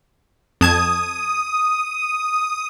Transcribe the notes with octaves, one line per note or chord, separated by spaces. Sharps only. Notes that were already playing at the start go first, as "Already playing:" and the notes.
F2 A5 D#6 G#6